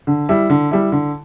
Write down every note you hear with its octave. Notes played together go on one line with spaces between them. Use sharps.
D3
G3 E4
D3
G3 E4
D3